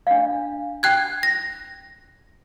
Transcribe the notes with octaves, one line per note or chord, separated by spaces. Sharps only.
D4 F5
G5 F#6 G#6
A#6